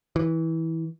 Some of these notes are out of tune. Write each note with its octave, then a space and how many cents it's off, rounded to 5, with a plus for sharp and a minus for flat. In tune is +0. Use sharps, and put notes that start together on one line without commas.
E3 -20